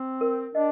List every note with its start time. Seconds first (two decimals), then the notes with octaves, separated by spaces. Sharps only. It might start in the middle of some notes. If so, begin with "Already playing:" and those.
Already playing: C4
0.21 A#4
0.55 D4 D#5